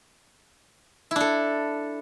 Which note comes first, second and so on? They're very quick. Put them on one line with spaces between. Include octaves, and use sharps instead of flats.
E4 D4 A4